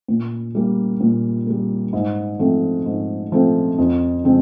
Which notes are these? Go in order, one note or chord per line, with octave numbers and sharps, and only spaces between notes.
A#2
G3 A#3
A#2
G3 A#3
G#2
F3 A3 C4
G#2
F3 A3 C4
F2
C#3 F3 G#3 C4